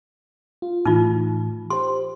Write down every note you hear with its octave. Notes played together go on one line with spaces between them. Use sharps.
F4
A2 E3 D#4 F4
G4 C5 C6